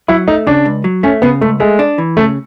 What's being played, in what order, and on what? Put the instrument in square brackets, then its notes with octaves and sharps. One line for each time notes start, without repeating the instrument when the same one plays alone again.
[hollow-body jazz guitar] F#3 [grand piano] E4
[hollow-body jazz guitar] A3 [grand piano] D#4
[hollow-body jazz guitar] C#3 [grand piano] D4
[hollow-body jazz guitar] C#2
F#3
[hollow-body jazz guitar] A3 [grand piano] C#4
[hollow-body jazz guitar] C#3 [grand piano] B3
[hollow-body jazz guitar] C#2 [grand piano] A3
[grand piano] G#3 [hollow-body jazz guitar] A3
[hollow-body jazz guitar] D4
E3
[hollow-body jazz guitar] C#3 [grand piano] A3